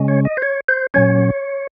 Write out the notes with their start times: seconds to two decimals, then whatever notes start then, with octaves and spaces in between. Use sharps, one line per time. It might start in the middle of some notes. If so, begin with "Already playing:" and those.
Already playing: C#3 G#3 C#4
0.08 C#5
0.25 D#5
0.37 C5
0.42 C#5
0.68 C5
0.94 A#2 F#3 C#4 C#5